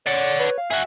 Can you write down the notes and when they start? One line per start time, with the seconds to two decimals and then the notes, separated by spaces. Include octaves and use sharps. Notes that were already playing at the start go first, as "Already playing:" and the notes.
0.06 C#5 D5 F#5
0.39 B4
0.58 F5
0.71 F#4 G#4 E5